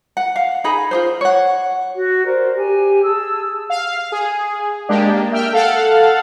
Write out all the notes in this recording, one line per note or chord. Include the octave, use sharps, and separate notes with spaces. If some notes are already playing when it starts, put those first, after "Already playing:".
F#5
F5
D#4 G#4 B5
F4 G#4 C5
C#5 F#5
F#4
A#4 C5 D5
G4 G#5
G#4 A5 E6
F5
G#4
G#3 A#3 D4 G4
A#3
E5 G5 F6
A4 F5 F#5